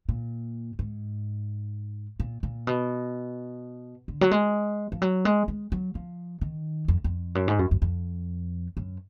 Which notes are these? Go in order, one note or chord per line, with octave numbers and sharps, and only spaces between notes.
A#2
G#2
A#2
A#2
B2
D3
F#3
G#3
F3
F#3
G#3
G#3
F#3
F3
D#3
F2
F2
F#2
G#2
F#2
F#2
F2
F#2